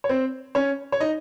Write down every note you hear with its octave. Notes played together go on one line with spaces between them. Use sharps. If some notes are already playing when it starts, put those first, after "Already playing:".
C#5
C4 C5
C#4 C#5
C#5
D#4 D#5